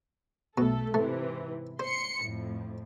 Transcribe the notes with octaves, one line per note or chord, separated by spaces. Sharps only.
B1 B2 A3 A4
G#2 C3 E3 A3
C5 C6 C#7
F2 A2